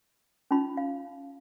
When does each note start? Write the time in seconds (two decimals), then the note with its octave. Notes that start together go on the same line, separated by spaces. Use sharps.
0.51 C#4 D#4 F4 B5
0.77 F5